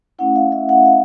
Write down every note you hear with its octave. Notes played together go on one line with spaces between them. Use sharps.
A3 C#4 E4 F#5
F5
E5
F#5
F5